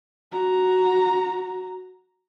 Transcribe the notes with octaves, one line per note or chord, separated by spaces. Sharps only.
F#4 A#5